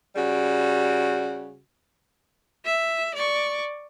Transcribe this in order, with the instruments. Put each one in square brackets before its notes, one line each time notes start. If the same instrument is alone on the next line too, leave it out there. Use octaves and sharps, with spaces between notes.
[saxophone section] C#3 G3 F#4
[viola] E5
D5 C#6